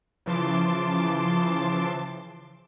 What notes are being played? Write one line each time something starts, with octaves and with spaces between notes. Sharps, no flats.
C#3 E3 F3 A5 C6 D6